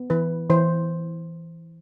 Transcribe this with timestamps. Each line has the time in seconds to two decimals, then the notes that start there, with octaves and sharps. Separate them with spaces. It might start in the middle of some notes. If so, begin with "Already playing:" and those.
Already playing: B3
0.10 E3 B4
0.50 E3 C5